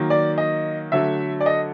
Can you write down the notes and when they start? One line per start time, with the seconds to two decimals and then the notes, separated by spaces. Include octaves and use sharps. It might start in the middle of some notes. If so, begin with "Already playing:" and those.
Already playing: D#3 F#3 A#3
0.10 D5
0.38 D#5
0.92 D3 F#3 A3 E5
1.41 D5
1.46 D#5